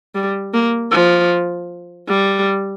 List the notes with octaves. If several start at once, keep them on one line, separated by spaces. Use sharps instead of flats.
G3
A#3
F3
G3